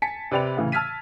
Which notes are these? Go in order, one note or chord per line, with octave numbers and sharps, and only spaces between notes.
G#5 A5 B6 C#7
C3 B4 D5 G5 B5 F7
A2 C#3 E3
A5 E6 F6 G#6 B6 D#7